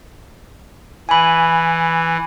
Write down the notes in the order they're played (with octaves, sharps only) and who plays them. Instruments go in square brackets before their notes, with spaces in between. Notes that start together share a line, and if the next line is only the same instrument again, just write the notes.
[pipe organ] E3 [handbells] G#5 B5